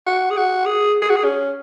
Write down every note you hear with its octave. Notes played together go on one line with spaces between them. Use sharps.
F#4
G#4
F#4
G#4
G#4
F#4
G#4
C#4